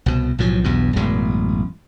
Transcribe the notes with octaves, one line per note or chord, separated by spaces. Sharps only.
C2 B2
B1 A2 F3 F#3
B1 E2 G2 B2
A1 F#2 B2 G#3